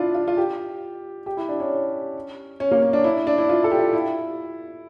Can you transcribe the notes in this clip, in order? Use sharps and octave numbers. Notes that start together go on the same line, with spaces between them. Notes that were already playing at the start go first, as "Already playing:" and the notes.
Already playing: D4 E4 F4
F4
F4
G4
G4
E4
D4
C#4
C#4
A#3
C#4
D4
E4
D4
E4
F4
A4
G4
F4
E4